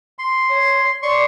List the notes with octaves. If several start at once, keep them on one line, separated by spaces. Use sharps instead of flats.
C6
C#5
D5 C6 C#6